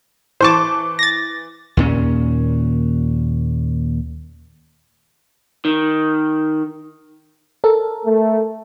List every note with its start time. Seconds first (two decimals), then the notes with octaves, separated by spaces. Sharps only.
0.41 E3 C5 A5 C#6 D6
0.99 A6 A#6
1.77 D#2 A#2 C#4
5.65 D#3
7.64 A4 A#4
8.06 A3